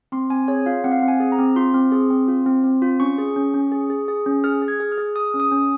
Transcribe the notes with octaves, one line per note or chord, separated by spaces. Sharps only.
C4 C6
C4 G#5
G#4 C#5
F4 F5
C4 F#5
F5
F#5
C4
G#5
G#4
A#5
C4
F4 C6
C4
G#4
C4
F4
C4
C4
F4
C#4 C#6
G#4
C#4
C#4
G#4
G#4
G#4
C#4
G#4 F6
G#4
G#6
G#4
F6
G#4
G#4 D#6
C#4
D#6
C#4